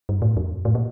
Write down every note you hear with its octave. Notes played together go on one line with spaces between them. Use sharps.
G2
A2
F2
A2
A#2